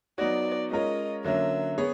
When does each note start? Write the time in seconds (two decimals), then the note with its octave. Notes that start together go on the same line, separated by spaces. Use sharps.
0.18 F#3 B3 D#4 F#4 D5
0.71 G#3 C#4 F4 A#4 C#5 D#5
1.24 D3 F#3 A#3 C#4 E5
1.78 B3 G#4 C#5